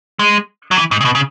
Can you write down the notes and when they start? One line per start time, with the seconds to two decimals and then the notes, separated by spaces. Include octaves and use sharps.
0.19 G#3
0.71 F#3
0.77 E3
0.91 G#2
1.01 C#3
1.05 B2
1.15 C#3